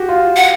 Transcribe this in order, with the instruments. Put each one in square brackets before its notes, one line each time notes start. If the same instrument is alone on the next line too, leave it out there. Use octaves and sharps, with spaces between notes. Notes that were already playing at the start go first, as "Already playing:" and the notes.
Already playing: [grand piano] F#4 G4
F4
[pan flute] F#5